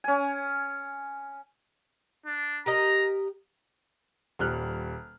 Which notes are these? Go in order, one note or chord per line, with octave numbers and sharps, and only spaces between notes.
C#4 G#5
D4
G4 A#4 D#5 A#5
D#1 G3 F6 F#6